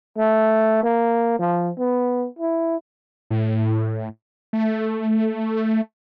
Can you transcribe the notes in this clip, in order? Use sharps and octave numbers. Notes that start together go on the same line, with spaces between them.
A3
A#3
F3
B3
E4
A2
A3